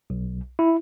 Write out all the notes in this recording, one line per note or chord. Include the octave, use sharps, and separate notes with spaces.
B1
E4